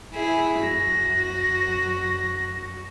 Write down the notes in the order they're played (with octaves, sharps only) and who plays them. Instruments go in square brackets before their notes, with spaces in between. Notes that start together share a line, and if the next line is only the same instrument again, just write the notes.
[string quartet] E4 G#4 E5
[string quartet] F#2 F#4 [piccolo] A#6